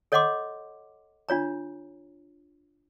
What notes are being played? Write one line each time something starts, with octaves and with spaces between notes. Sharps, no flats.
A4 C#5 D#5 F#5 C6 D6
D4 F4 C#5 A#5